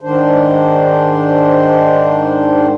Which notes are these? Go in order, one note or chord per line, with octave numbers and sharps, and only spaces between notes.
G#2 D#3 D4 C5